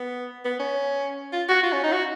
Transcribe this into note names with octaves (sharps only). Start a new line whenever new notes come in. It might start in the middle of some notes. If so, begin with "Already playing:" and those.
Already playing: B3
B3
C#4
F4
F#4
F4
C#4
D#4
F#4